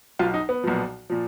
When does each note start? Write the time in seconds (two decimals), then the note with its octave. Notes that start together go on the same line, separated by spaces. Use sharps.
0.19 B1 B2 F4
0.34 D#4
0.49 B3
0.64 B1 A#2 F3
1.10 A#2 F3